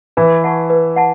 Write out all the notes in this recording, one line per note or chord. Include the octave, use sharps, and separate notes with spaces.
E3 E4 B4
F#5 A5 C#6
B4
F#5 A5